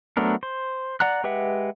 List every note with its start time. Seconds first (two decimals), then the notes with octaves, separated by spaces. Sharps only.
0.17 F#3 A3 B3 D4 A#4
0.43 C5
1.00 D5 F#5 A#5 F#6
1.24 G#3 G4 B4 E5 F#5